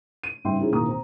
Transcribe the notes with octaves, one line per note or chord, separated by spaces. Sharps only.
D#7
G#2 C#3 G3 E5 G5 C6
C4 C#4 D#4 E4 G4 G#4
E1 A2 D#3 A#3 A#5 D#6
C4 A#5